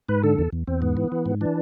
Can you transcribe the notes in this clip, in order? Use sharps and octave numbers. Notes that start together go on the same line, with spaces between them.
G#2 B4
D3 A4
E2
E2
E2 C4
G#2 B3
E3
E3
G#2
E3 D4